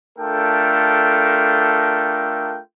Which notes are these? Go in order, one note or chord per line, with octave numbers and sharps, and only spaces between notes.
A3 D4 F4 A4 A#4 G5